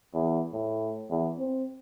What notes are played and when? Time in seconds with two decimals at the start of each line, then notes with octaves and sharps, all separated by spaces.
0.14 E2
0.53 A2
1.10 E2
1.39 C4